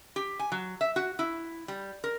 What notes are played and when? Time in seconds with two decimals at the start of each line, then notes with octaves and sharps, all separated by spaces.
0.16 G4
0.39 G#5
0.52 F#3
0.81 E5
0.96 F#4
1.19 E4
1.68 G3
2.04 A#4